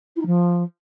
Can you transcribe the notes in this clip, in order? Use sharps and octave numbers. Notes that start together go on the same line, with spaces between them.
E4
D#4
F3